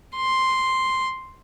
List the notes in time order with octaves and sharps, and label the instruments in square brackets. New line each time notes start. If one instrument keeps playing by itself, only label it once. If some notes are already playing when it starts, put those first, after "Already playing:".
[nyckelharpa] C6